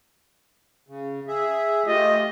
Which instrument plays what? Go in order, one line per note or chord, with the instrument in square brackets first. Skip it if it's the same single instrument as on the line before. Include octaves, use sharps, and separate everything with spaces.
[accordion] C#3
G#4 E5
[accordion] A3 F4 G4 [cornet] D#5